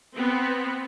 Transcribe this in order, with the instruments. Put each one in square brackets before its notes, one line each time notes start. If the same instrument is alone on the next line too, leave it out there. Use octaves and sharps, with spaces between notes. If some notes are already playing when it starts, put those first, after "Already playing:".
[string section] B3 C4